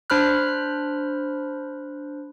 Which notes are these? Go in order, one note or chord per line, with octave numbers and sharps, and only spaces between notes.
D4 C5 B5 F6 F#6